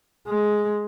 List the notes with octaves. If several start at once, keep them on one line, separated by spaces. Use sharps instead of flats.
G#3